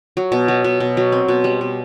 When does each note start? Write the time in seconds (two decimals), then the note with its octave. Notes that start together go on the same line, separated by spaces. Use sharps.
0.17 F#3
0.32 B2
0.48 F#3
0.64 B2
0.80 B2
0.97 F#3
1.12 C4
1.28 B2
1.44 G3
1.61 B2